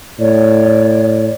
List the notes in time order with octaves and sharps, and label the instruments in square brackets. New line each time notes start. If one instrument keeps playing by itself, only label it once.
[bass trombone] A2 [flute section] C#5 D5